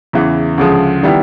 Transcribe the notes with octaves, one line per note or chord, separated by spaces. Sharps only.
E2 C#3 E3
D2 C#3 F3 G#3
D#3 G3 B3 E4 G4